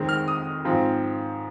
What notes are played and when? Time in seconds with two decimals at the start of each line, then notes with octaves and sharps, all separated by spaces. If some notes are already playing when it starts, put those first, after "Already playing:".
Already playing: F2 D#3 G#3 C4
0.09 F6
0.28 D#6
0.65 G#2 F3 C4